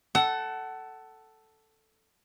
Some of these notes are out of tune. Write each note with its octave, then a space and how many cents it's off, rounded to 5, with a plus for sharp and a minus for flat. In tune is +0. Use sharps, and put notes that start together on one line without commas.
A4 +0 F#5 +25